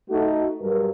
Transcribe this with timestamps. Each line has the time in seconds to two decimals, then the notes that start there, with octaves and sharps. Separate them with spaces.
0.10 A3 D#4 F#4
0.61 G2 F#3 A#4